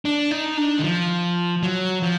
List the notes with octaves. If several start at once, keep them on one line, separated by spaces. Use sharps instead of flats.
D4
D#4
D4
D#3
F3
F#3
F3